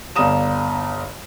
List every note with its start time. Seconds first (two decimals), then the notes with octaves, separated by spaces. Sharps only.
0.16 G1 D5 F5 A#5 D#6 E7